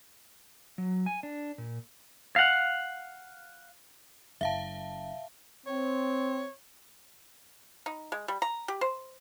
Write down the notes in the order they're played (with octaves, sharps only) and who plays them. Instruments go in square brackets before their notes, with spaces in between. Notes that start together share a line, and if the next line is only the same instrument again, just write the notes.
[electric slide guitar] F#3
G#5
D4
A#2
[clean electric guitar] F5 F#5
[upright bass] F#1 [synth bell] E5 F5 A5
[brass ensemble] C4 [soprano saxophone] C#5
[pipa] D#4
G#3
G3
A#5
G4
C5